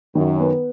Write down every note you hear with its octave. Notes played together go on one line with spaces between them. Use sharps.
F#2 D#3
B3